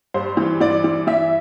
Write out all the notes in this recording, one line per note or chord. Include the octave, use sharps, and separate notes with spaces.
G2 C5
E3
E3 D5
E3
E3 E5